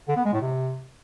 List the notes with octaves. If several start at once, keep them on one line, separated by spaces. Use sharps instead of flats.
D3
B3
G#3
A2
C3